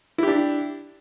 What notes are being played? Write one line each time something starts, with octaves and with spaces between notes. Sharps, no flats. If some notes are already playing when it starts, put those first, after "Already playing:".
D4 E4 G4